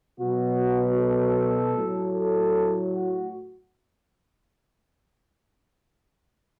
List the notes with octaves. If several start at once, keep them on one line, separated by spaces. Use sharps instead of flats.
B2 F#3 F#4
A4
A2 F#3
A4
F#4